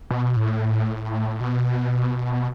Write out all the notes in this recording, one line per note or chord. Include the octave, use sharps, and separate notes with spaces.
B2
A2
B2